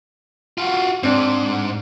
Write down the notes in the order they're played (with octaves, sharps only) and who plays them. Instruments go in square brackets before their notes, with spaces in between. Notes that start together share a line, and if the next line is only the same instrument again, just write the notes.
[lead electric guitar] F4 F#4
[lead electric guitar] G#2 [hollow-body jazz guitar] C4 D4